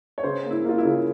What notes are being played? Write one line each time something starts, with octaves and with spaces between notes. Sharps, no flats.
C#5
C#3 C5
A#3
E4
A#3 F4
E4
C#3